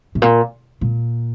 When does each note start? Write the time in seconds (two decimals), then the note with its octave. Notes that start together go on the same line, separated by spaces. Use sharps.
0.15 A2
0.22 A#2
0.81 A#2